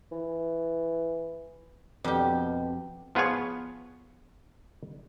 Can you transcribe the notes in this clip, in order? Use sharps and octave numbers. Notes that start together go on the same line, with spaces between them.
E3
F2 B2 G4
F3 B3 F4 G#4 C#5